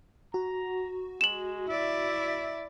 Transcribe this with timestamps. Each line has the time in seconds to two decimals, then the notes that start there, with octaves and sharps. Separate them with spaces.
0.34 F#4 A#5
1.21 G#3 E7 F#7
1.68 E4 D5 E5